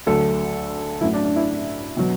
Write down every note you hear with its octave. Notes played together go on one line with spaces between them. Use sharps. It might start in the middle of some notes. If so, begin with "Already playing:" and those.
D2 D3 F#3 A4
A1 A2 F#3 E4
D4
D4
E4
B2 F#3